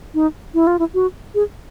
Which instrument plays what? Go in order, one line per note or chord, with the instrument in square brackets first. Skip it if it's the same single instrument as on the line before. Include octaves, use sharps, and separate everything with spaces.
[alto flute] D#4
E4
F4
E4
F#4
G#4